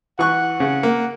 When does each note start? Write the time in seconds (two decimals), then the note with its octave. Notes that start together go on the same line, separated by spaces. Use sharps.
0.19 E3 F#5 C#6 F#6
0.60 C#3
0.83 A#3